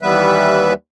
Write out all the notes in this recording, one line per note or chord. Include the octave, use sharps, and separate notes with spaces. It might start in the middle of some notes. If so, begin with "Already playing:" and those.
D#2 E3 G3 B3 B4 E5